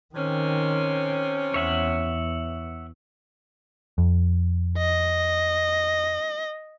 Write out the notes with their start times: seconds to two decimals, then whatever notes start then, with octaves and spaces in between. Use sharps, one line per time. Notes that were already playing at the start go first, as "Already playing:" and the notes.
0.15 C3 D#3 C4 C#4
1.54 E2 C#5 E5 F#5
3.98 F2
4.78 D#5